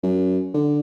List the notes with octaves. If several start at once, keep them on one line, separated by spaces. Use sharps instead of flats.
F#2
D3